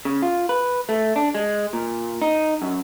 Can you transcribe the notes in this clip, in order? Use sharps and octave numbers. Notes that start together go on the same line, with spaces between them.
C#3
F4
B4
A3
D4
G#3
A#2
D#4
F#2